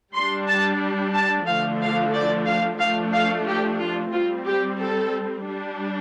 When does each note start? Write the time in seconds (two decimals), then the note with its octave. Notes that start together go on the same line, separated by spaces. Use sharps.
0.14 G3 D4 C6
0.47 A5
1.14 A5
1.46 D3 F3 A3 D4 F5
1.80 F5
2.13 D5
2.46 F5
2.79 F3 A3 D4 F5
3.13 F5
3.46 G4
3.79 F4
4.12 G3 C4 F4
4.45 G4
4.79 A4
5.45 G3 D4